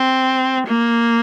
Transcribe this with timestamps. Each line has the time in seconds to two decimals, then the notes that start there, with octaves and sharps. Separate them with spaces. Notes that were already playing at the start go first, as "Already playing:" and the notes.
Already playing: C4
0.67 A#3